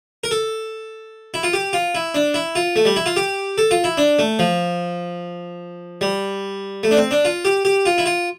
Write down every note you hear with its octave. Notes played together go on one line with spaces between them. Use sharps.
A#4
A4
E4
F4
G4
F4
E4
D4
E4
F4
A3
G3
E4
F4
G4
A4
F4
E4
D4
A3
F3
G3
A3
D4
C4
D4
F4
G4
G4
F4
E4
F4